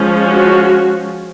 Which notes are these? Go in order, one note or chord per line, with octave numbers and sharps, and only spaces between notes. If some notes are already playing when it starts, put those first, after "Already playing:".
Already playing: F3 G#3 C#4
F#4